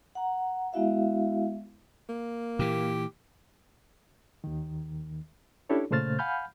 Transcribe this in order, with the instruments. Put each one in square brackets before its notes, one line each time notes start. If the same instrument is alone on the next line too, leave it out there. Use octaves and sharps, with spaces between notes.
[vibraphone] F#5 A#5
G#3 B3 E4 F#4 E5 F5
[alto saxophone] A#3
[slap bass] A#2 E3 [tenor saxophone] G4
[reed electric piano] D#2 D#3
C#4 D4 E4 G4 A4 C#5
A#2 C#3 A3 C5 F6 A6
F5 F#5 G#5 B5 F6 G6